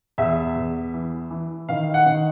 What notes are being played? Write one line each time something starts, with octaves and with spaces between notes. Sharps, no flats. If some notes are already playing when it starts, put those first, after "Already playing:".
E2 E5
E2
E3
E3
D#3 F5
F#5
D#3